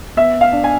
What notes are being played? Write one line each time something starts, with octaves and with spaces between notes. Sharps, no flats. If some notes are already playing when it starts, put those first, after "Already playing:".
B3 E5
F5
D4
G#5